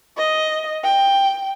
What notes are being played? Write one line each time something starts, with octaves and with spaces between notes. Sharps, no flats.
D#5
G5